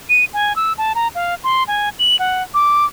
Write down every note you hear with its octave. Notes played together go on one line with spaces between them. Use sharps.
D#7
G#5
E6
A5
A#5
F5
C6
G#5
F#7
F#5
D6